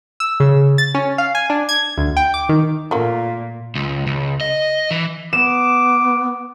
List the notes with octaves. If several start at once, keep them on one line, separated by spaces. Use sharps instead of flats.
E6
C#3
A6
C#4
F5
G#5
D4
G#6
D2
G5
D6
D#3
A#2 A3 A#3 F4
C#2
C#2
D#5
E3
B3 D6 E7